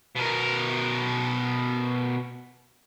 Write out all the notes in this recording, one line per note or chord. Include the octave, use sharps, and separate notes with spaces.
B2 A#4